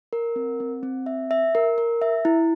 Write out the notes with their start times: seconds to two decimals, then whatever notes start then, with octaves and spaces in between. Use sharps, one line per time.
0.13 A#4
0.36 C4
0.60 C4
0.83 C4
1.06 E5
1.31 E5
1.55 A#4
1.78 A#4
2.02 E5
2.25 E4